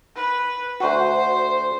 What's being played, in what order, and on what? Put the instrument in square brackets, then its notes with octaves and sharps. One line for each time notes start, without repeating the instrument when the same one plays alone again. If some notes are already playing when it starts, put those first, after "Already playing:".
[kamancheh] B4
[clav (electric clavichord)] D2 F#4 [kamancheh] C5